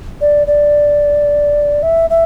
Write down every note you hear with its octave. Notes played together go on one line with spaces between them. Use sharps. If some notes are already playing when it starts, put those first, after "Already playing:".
D5
D5
E5
E5